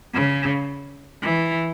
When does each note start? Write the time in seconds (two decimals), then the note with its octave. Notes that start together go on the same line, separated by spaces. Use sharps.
0.14 C#3
1.22 E3